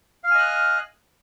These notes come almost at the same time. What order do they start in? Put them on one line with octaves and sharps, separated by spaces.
F5 F6 G#5 D#5 F#6